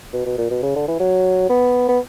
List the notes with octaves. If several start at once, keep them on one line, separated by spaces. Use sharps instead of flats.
B2
B2
A#2
B2
C#3
D3
E3
F#3
B3
B3